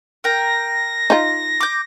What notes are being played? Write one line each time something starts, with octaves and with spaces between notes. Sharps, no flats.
A#4 G5 A#6
D#4 F4
D6 G6